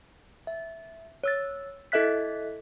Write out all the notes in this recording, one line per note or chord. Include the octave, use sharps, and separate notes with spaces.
E5
C#5 E6 A6
E4 A4 D#5 E5 F#6 B6